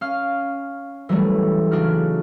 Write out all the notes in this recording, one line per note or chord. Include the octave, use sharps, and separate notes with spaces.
C#4 F5 F6
E3 F#3 G3 A3
C#3 D4 D#4 F#4 F6